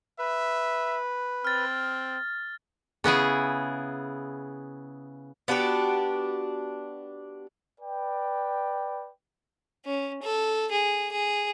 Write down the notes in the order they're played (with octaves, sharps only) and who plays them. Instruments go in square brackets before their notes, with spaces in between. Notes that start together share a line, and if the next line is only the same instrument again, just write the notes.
[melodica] B4 [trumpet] E5
[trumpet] C4 [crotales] F6 A6
[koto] C#3 B3 E4 G#4
[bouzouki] B3 D4 F#4 G4
[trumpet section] B4 D5 G5
[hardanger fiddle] C#4
A4
G#4
G#4